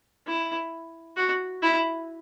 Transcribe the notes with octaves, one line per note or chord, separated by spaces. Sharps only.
E4
F#4
E4